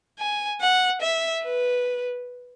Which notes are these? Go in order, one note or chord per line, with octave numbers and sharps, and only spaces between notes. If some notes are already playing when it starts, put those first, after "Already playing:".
G#5
F#5
E5
B4